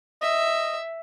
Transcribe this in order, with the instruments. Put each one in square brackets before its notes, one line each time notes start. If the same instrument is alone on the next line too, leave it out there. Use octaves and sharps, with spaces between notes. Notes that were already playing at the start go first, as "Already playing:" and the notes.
[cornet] D#5 [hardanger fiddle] E5